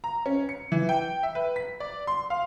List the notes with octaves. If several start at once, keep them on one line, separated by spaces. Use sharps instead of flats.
A#5
C#4
C#7
E3
G5
E5
B4
B6
D5
C6
F5